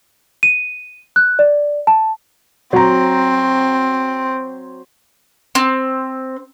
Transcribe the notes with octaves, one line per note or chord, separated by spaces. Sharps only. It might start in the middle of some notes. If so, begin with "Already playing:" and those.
D#7
F#6
D5
A5
F#3 C4 A#5
C4